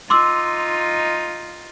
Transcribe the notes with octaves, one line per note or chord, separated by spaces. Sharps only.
D#4 F4 C6 D6 E6